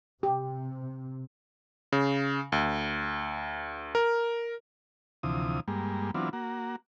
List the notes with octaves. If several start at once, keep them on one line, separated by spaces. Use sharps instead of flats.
C3 G4
C#3
D2
A#4
D2 C3 E3 F3 D#6
G2 G3 G#3 A#3
E3 F#3 B3 C4 D4 F4
A#3 F#4